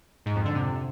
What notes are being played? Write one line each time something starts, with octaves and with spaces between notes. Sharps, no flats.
G#2
F2
D3
C3